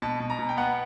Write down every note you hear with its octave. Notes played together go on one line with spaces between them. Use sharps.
B2 A5
B2
A#5
B2
G5
B3 F#5